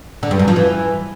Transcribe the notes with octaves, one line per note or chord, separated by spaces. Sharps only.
D3
G2
F#2
F3
E3